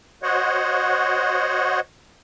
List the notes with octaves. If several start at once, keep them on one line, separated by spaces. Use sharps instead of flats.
F#4 C5 C#5 D#5 F#5